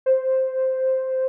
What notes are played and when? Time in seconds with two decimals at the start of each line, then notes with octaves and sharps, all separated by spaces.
0.06 C5